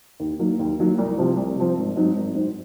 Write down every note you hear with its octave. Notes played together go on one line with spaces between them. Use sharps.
D#2
D#3 F#3 A#3
D#2
D#3 F#3 A#3
C2
C3 F3 C4
C2
C3 F3 C4
G#1
G#2 F#3 C4 D#4
G#1
G#2 F#3 C4 D#4